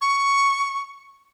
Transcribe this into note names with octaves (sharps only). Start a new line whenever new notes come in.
C#6